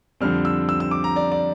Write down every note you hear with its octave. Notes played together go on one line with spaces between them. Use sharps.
F2 D3 G3 C4 F6
E6
E6
E6
D6
A#5
D5
D5